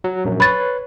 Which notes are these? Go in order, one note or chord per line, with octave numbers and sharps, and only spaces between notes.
F#3
A#1 F#2
B4 C#5 B5 A6